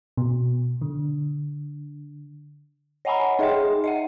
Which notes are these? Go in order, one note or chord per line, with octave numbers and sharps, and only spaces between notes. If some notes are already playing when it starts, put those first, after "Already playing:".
B2
D3
C#5 D#5 F#5 G#5 A#5 B5
D#4 G#4 D#5 E5 G5 C6
D#5 E5 F#5